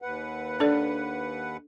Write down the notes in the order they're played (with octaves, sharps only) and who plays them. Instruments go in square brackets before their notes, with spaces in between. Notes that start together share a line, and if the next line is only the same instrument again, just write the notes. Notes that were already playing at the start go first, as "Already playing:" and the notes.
[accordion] D#2 B4 F#5
[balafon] D4 A4 D5